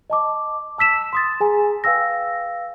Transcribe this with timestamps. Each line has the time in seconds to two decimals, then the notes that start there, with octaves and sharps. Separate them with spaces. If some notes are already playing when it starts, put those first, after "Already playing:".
0.10 D#5 A5 D6
0.78 A5 E6 B6 E7
1.13 C6 D#6 A6
1.40 G#4 G#5 A#5
1.84 B4 F5 G5 E6 A#6